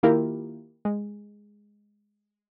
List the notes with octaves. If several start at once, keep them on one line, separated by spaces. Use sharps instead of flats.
D#3 A#3 E4 F4 G4 A#4
G#3